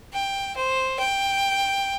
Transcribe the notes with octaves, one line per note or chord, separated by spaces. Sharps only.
G5
C5
G5